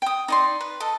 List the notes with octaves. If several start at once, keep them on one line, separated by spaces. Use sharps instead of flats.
G5 D#6
D#4 D5 C6
B4
A4 D#5